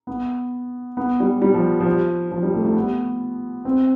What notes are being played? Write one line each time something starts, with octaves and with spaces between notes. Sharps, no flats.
B3
B3
G3
G3
F3
F3
F3
G3
A3
A3
B3
C4